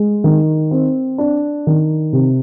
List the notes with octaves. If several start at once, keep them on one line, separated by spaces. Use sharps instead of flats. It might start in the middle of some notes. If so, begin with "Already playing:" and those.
Already playing: G#3
D#3
C4
D4
D#3
C3